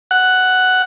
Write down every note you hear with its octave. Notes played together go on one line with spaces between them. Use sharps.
F#5